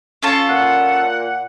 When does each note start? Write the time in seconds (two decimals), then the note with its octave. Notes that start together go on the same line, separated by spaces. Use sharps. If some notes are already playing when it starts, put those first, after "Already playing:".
0.22 C#4 F4 A4
0.50 A#2 F#5